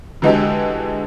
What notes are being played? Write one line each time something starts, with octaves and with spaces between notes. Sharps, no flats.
D3 E3 G#3 F#4 G4 A4